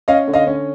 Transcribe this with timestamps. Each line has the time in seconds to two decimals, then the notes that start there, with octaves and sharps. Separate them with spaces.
0.08 C#4 D#5 F5
0.28 D3
0.34 D#5 F5
0.47 C#4